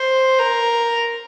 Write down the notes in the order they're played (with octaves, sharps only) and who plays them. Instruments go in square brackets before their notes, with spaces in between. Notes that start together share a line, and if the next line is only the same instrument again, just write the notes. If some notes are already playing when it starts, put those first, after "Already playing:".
Already playing: [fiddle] C5
A#4